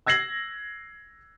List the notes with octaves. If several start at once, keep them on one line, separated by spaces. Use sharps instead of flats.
E6 G#6 A#6 C7 F#7